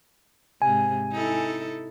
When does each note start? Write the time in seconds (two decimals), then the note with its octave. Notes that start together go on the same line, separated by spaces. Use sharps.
0.62 G#2 C3 G#5
1.12 D#4 E4 A4